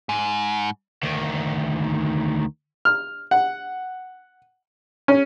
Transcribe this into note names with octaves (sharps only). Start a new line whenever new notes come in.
G#2
D2 D#3
F6
F#5
C#4